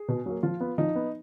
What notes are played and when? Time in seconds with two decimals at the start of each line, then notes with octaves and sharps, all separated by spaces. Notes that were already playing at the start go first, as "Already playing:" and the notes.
Already playing: G#4
0.08 B2
0.26 F#3 A#3
0.43 F3 F4
0.61 B3
0.78 F3 D#4
0.96 B3